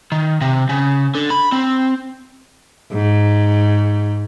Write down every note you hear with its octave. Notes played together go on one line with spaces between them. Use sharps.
D#3
C3
C#3
D3
B5
C4
G#2